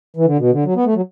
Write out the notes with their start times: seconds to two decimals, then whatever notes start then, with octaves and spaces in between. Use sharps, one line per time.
0.16 E3
0.25 D3
0.39 B2
0.52 D3
0.65 F#3
0.76 B3
0.85 A3
0.95 F#3